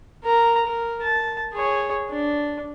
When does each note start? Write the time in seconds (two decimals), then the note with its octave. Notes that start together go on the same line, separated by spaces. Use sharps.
0.24 A#4 A#5
0.65 A#4
1.02 A5
1.53 G#4 C#5
2.10 D4